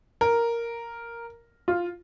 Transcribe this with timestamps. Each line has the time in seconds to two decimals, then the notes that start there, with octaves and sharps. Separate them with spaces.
0.21 A#4
1.68 F4